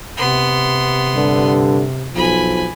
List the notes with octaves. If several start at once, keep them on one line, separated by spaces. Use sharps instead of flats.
C3 B3 C6
G2 D3 D4
B1 F3 G#5 B5